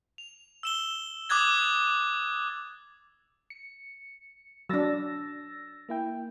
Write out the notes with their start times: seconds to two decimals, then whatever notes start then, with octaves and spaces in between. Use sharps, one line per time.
0.18 F7
0.63 E6 E7 G7
1.29 D6 D#6 F#6 G#6 A6
3.50 C#7
4.69 F#3 D4 E6 A6 A#6
5.89 A#3 E4 G5